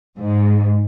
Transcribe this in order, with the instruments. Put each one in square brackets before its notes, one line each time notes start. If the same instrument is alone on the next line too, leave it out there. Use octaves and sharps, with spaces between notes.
[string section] G#2